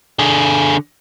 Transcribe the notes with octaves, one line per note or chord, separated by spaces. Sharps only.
D3 G#4